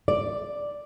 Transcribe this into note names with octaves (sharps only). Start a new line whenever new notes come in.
D5